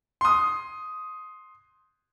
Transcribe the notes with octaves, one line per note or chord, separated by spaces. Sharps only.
C6 D#6